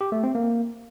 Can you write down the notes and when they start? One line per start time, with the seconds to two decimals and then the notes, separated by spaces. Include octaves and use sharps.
0.01 G4
0.12 A3
0.23 C4
0.35 A#3